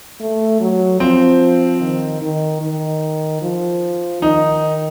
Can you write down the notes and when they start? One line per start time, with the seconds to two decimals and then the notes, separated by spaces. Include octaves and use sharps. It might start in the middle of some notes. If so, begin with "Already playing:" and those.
0.20 A3
0.61 F#3
1.00 F3 C4
1.81 D#3
2.22 D#3
2.62 D#3
3.42 F3
4.22 D#3 D#4